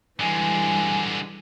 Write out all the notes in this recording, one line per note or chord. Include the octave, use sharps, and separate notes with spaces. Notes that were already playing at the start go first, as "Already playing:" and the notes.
D3 E3 G3 G#3 G#5